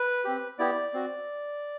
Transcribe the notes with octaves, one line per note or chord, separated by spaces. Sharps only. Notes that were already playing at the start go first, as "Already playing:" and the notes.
Already playing: B4
C4 G4
B3 E4 G4 D5
C4 F#4